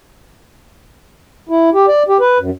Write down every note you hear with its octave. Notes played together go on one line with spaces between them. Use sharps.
E4
G4
D5
G4
B4
F#2